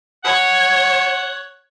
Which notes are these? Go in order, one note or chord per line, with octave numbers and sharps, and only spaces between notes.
C#5 F#5